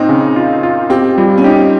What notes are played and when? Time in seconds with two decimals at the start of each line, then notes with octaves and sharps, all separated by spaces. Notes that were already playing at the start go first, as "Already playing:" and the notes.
Already playing: A#2 C4 D#4
0.09 C#3
0.36 F4
0.63 F4
0.90 C4 G4
1.17 G3 F4
1.38 C#4
1.44 D#4 G4